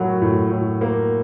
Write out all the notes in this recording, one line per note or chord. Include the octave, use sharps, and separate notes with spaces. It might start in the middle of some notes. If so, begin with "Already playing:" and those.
Already playing: A2 F#3 A#3
A2
A2
A#3